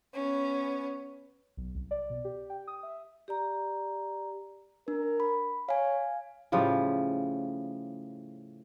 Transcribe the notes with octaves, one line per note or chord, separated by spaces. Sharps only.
B3 C#4
B1
C2
D5
B2
G4
G5
D#6
E5
G4 D5 A#5
D4 A#4
B5
C#5 F5 G#5
A2 C#3 F3 G3